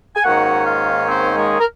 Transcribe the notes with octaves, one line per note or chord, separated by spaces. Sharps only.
G#5
G#2 D#3 A#3 C#4 F#4 F#5
F4 F5
C4 C5
G#3 G#4
A#4